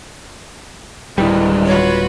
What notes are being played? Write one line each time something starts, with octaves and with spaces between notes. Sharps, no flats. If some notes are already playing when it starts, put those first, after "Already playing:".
D1 G2 D#3 G3 G#3 E4
F4 F#4 B4 C#5